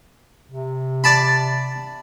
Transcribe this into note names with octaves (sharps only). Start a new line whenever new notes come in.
C3
D5 A5 B5